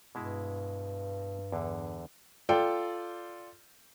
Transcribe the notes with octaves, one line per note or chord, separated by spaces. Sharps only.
G2 B2 G#3 E4
E2 D3
F4 A4 D5 G5